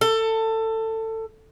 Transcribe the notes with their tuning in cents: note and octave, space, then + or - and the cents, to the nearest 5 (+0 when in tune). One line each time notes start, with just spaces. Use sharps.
A4 +20